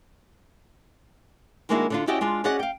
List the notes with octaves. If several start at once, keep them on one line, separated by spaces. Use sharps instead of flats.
D#3 G#3 A#3 D4 E4 F#4
D3 D4 F4
C#4 E4 F#4 G4 D5 D#5
G#3 D4 F4
C#4 F#4 G#4 D5 D#5 F#5
F5 G5